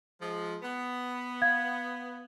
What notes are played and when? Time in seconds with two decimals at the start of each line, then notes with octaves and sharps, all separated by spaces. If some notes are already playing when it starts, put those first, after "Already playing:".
0.21 F3 G#3
0.62 B3
1.42 F5 G#6